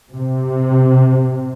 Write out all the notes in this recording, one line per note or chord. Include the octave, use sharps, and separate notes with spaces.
C3